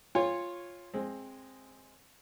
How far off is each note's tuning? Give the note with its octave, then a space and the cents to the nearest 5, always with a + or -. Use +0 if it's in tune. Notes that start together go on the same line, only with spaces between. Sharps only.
F4 +0 C#5 -10 G#5 -40
G#3 +0 C4 +15